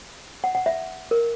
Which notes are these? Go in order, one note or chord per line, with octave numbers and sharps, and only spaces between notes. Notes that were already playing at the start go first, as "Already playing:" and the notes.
F#5
F#5
E5
A#4